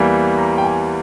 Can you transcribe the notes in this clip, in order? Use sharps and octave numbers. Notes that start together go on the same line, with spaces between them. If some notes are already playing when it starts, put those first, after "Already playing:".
Already playing: E2 E3 G3 A#3
A#5
G5
G#5